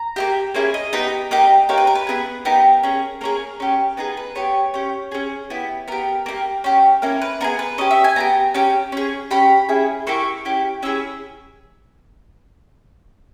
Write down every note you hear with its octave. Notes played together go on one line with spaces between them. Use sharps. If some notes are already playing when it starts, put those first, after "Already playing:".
Already playing: A#5
A#3 D#4 G4
A#3 C#4 E4 G#4
D#5
B3 D#4 G4
A#3 D#4 G4
A#3 D#4 G4 C#5
B4
A#4
B4
B3 E4 G#4
B3 D#4 G4 A#4
C#4 G#4
A#3 C#4 G#4 A#4
C#4 G4
B3 D#4 G#4 B4
B4
B3 G4 C#5
C#4 G4
C#4 G#4
B3 E4 G4
B3 G4 A#4
A#3 D#4 G4
C#4 G4
A#3 C#4 E4 A#4
B4
B3 D#4 G#4 A#4
B4
C#4 G4 D#5
E5
G#5
B3 D#4 G4 A#5
C#4 G4
C#4 G#4
C#4 G4 B5
C#4 E4 G#4
A#3 E4 G4 C#6
C#4 E4 G4
C#4 E4 G#4 E6